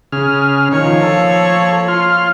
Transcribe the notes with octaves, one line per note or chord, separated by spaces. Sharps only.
C#3 G#4 F6
D#3 F3 A#3 C#5
A4
F4 C6 F6